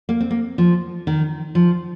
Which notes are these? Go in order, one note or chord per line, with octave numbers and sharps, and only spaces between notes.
A#3
C4
A#3
F3
D#3
F3